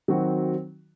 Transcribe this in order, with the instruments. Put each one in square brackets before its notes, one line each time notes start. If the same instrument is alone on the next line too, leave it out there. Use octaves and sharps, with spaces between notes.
[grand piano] D#3 F#3 C4 F#4